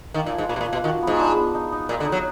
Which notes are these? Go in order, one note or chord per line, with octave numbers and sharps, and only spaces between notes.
D#3 A#3
A#2
F3
G#2
A#2 A#3
B2
A#2
F3
B2
D#3 F#4
G#2 B3
D4
B3
D#4
D#4
A#2 D#4
D3
D#4
F#3